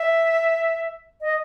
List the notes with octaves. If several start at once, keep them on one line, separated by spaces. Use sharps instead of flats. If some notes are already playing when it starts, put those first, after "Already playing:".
Already playing: E5
D#5